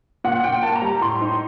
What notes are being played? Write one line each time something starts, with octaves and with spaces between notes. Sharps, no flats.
A#2 F#5
A#2 G5
A#3 A5
A#5
G3
A2 C6
D#4